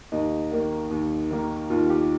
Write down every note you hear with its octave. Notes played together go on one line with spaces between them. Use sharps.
D#2 D#4
D#3 A#3
D#2
D#3 A#3
D#2 F4
G4